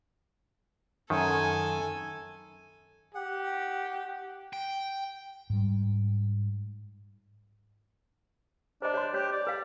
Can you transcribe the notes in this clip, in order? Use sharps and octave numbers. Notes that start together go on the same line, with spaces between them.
F#2 D#3 A4 G#5
G4 F#5
G5
G#2 G3
D4 C5 D#5
C#5 D#5 C6
G4 C#5
D5
B4 F5